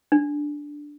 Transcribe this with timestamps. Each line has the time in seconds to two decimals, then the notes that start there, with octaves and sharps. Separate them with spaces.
0.12 D4